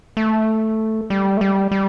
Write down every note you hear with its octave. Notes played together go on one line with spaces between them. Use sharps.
A3
G3
A3
G3
G3